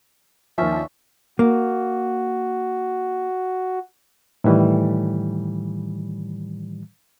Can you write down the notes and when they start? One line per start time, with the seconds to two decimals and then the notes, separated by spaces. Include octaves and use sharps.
0.58 D#2 D#3 F3 C#4 E5
0.71 D4
1.39 A#3 F#4
4.44 A2 D#3 E3 G3